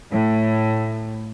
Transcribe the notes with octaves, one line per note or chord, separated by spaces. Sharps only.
A2